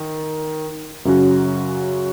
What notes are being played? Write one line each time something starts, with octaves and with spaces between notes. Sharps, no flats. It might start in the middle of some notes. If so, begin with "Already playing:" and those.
Already playing: D#3
F#2 C#3 F#3 C#4 F#4